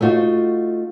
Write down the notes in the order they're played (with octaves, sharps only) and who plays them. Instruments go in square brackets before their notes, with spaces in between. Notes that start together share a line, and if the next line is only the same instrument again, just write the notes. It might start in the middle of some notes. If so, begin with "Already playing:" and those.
[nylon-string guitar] A3 D#4 F4 F#4